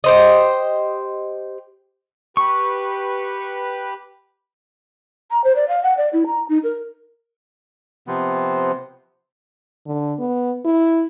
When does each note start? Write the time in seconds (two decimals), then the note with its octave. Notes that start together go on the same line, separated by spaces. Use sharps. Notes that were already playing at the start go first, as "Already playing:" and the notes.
0.04 G4 C5 D#5
2.37 G4 B4 C#6
5.30 A#5
5.44 C5
5.56 D5
5.68 F5
5.83 F#5
5.97 D5
6.13 E4
6.27 A#5
6.49 D#4
6.64 A#4
8.07 C3 F3 B3 C4
9.86 D3
10.19 B3
10.65 E4